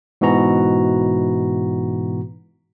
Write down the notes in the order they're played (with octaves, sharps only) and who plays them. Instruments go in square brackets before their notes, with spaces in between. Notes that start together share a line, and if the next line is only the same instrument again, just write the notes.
[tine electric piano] G#2 B2 E3 F#4 A#5